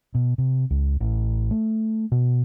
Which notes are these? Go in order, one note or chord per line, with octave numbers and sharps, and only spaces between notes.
B2
C3
C#2
A1
A3
B2